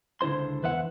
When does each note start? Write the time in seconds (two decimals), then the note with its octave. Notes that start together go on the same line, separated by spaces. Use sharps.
0.21 C#2 D3 E4 C5 C6
0.63 E2 B4 E5 F#5